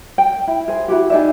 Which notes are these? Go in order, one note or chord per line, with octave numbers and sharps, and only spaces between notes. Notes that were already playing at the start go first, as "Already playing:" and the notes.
G5
E4
G#4 C5
E4 F#4 G4
D#4 G#4 D5 E5